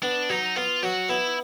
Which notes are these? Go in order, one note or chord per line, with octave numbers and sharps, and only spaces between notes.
B3 D4
F#3 D#4
B3 F4
F#3 F#4
B3 E4